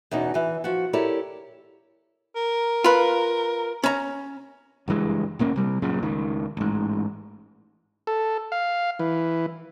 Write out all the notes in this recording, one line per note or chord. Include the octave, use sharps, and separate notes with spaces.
E2 B2 C#4 D#4
E3 G#5
F3 F#4
E4 G4 A4 A#4 C#5 D5
A#4
F4 B4
C#4 A#5
F#1 G2 E3 G#3
D1 A#2 A#3 C#4
C3 G3
F#2 A#2 C#3
C#2 D#3
A1 G#2
A4
F5
E3